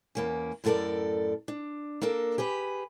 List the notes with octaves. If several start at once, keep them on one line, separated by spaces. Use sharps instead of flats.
E2 A#3 C#4
F#2 A2 F4 A4 A#4 D5
D4
A#3 D4 A4 A#4
G4 G#4 B4